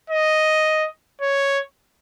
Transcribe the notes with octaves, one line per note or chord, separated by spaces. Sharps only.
D#5
C#5